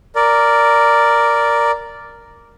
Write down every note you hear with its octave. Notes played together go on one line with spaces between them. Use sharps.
A#4 D5